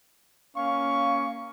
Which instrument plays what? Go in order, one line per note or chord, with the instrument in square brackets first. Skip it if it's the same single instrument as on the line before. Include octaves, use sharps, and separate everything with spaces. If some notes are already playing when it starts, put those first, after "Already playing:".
[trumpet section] A#3 C#4 C#6 [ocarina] F5